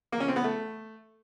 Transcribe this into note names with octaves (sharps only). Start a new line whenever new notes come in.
A#3
C#4
C4
B3
A3